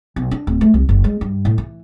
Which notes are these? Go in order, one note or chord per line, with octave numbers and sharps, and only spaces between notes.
B1
D4
D1
A3
C2
F#1
G#3
G2
A2
E3